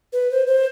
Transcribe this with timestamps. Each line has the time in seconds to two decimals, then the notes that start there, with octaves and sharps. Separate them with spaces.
0.13 B4
0.31 C5
0.47 C5